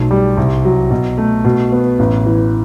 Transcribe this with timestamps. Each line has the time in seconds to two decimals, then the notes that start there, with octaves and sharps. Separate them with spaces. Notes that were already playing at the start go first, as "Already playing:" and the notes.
Already playing: B1 A3
0.11 G3
0.37 C2
0.65 F#3
0.91 B2
1.18 A3
1.45 B2
1.72 B3
1.99 A1
2.26 E3